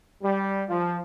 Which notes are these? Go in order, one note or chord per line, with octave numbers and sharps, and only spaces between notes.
G3
F3